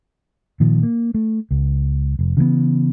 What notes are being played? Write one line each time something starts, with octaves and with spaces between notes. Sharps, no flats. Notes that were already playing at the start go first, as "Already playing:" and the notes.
A#2 D#3 F3
A#3
A3
C#2
F1
C#3 E3 G#3 B3